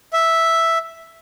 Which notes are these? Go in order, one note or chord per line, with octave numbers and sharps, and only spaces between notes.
E5